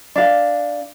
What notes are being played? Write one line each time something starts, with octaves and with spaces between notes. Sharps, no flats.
D4 F5